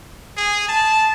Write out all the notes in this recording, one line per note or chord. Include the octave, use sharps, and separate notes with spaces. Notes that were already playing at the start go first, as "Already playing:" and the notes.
G#4
A5